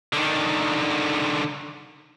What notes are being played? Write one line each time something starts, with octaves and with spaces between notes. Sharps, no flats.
D3 D#3